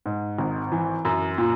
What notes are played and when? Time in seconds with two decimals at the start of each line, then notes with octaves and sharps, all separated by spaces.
0.06 G#2
0.39 G#1
0.72 E3
1.05 F#2
1.38 A#2